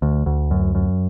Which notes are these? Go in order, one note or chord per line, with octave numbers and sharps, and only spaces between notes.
D2
D2
F#2
F#2